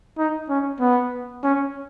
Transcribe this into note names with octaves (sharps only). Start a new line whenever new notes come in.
D#4
C#4
B3
C#4